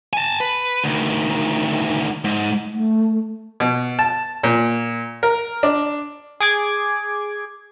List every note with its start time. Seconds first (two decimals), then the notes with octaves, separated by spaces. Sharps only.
0.13 G#5 A5
0.40 B4
0.84 D2 D#3
2.25 G#2
2.73 A3
3.60 B2
3.99 A5
4.43 A#2
5.23 A#4
5.63 D4
6.40 G#4 D6 G#6